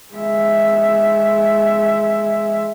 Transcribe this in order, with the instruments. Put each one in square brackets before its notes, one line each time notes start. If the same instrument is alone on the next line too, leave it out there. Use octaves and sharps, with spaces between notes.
[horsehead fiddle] G#3 E5